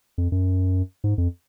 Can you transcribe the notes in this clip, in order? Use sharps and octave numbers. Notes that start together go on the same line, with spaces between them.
F2
F#2
G#2
F2